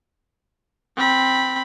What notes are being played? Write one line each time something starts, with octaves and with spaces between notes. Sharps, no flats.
C4 B5